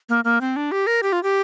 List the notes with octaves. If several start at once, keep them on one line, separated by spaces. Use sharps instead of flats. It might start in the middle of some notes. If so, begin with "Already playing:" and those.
A#3
A#3
C4
D4
G4
A#4
G4
F4
G4